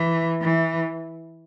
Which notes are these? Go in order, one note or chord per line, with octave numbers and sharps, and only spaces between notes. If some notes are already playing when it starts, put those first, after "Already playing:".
Already playing: E3
E3